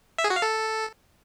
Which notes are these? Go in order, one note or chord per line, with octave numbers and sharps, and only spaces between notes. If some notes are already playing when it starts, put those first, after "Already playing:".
E5
G#4
F#4
F5
A4